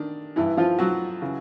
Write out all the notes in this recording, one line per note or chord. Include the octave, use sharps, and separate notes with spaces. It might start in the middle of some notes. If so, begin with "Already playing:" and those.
Already playing: D#3 D4
G2 E3 E4
F3 F4
F#3 F#4
C#3 E3